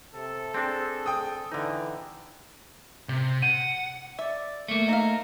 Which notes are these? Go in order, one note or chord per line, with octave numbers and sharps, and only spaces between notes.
C3 A4
C4 D4 G#4
G5 D#6
D3 E3 D#4
C3
F#5 D#7
D5 E5
A3 A#3
D#4 F5 A#5